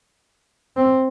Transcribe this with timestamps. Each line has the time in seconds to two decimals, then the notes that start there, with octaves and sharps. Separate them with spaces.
0.76 C4